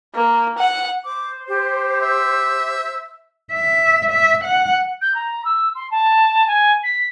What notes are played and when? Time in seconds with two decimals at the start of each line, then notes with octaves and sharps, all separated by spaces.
0.15 A#3
0.58 F#5
1.05 C5 D6
1.49 G4
2.01 E5
3.53 E5
4.11 E5
4.44 F#5
5.01 G6
5.14 A#5
5.44 E6
5.75 C6
5.91 A5
6.47 G#5
6.83 B6